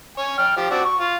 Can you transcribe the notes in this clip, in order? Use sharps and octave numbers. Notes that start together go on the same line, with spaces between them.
C#5 G#5
G5 F6
F3 G4
C4 D4 F#4
C#6
F4